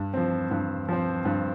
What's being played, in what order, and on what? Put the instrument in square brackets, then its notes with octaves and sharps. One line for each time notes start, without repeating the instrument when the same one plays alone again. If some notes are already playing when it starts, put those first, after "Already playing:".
Already playing: [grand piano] G2
F3 C4
G2
F3 C4
G2